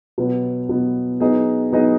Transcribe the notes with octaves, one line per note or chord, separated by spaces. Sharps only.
B2 F#3 B3
B2 F#3 B3
F#3 B3 D#4 G#4 D#5
F#3 B3 D#4 G#4 D#5